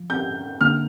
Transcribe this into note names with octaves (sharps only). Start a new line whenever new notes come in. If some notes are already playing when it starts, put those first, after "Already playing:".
Already playing: F3
G6
D3 A#3 D4 F6